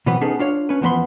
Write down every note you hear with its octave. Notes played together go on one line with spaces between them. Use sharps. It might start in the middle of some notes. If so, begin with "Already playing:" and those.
B2 E3 F#3 B3 C4 B4
B3 C#4 D#4 G#4 A4 B4
D4 F4 C#5
C#4 B4
E2 F3 B3 D#5 B5 C6